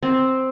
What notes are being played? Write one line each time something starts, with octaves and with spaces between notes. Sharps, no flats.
C4